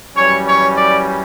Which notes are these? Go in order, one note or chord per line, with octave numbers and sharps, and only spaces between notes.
F#2 E3 G3 C#4 C#5
C#5
D5